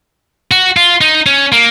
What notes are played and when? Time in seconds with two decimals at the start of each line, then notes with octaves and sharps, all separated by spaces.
0.51 F#4
0.77 F4
1.01 D#4
1.26 C#4
1.52 A#3